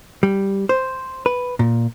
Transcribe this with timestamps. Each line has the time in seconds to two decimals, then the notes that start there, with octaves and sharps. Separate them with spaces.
0.23 G3
0.69 C5
1.26 B4
1.59 A#2